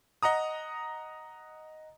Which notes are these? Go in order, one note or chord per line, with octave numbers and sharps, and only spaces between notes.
D#5 F#5 A#5 D#6